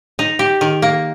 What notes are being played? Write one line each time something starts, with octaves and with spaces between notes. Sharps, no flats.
D#4
G4
D#3
A#3